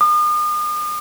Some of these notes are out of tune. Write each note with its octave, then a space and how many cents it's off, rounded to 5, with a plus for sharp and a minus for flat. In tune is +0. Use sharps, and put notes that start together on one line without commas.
D#6 -40